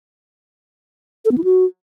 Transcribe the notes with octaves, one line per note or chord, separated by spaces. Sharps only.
A4
B3
E4
F#4